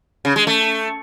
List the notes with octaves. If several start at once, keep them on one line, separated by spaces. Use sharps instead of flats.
C#3
G#3
A3